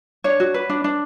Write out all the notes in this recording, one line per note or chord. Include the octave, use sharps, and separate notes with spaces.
D4 C#5
F#4
B4
D4
D4